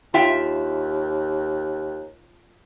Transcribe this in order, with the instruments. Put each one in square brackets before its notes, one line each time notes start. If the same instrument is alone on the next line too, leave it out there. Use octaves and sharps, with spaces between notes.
[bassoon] D#2 [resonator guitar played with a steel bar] F4 E5 G5